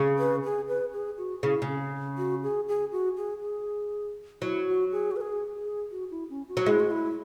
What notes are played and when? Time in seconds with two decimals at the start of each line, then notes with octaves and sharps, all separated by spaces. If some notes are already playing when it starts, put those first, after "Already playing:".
Already playing: C#3
0.18 B4
0.44 G#4
0.68 B4
0.93 G#4
1.18 F#4
1.43 C#3 E4
1.62 C#3
1.67 C#4
2.18 F#4
2.43 G#4
2.68 G#4
2.92 F#4
3.17 G#4
3.42 G#4
4.42 F#3 E4
4.67 F#4
4.92 G#4
5.11 F#4
5.16 B4
5.21 G#4
5.55 G#4
5.91 F#4
6.11 E4
6.30 C#4
6.48 F#4
6.57 F#3
6.66 G#3 E4
6.80 F#4
6.91 E4